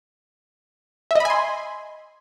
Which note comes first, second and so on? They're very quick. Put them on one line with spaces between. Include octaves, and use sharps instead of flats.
E5 D#5 B5 G#5 C6